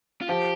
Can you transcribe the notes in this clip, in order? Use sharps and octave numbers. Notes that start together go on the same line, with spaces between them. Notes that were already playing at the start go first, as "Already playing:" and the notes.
F4
F3 G4